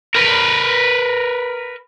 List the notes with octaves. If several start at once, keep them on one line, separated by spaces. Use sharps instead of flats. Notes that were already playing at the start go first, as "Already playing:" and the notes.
A#4 B4